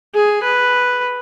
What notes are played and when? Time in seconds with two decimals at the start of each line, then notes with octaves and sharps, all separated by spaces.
0.14 G#4
0.43 B4